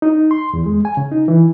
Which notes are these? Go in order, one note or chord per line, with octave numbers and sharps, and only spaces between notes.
D#4
C6
E2
G#3
G#5
C#3
D#4
E3